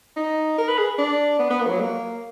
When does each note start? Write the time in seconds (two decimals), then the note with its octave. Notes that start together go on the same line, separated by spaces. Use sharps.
0.16 D#4
0.58 A#4
0.68 B4
0.78 G#4
0.98 D4
1.39 B3
1.50 B3
1.60 A#3
1.66 F3
1.70 F#3
1.80 A#3